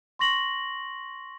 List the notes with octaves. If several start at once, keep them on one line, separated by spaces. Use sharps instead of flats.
C6 C#6 A#6 F#7